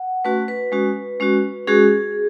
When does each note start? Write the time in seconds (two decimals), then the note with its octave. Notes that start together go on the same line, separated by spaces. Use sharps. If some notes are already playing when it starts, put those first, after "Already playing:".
Already playing: F#5
0.25 A3 C#4 F#4 B4
0.48 B4
0.72 G#3 C#4 F#4
1.20 G#3 C#4 F#4
1.67 G#3 C#4 F#4 G#4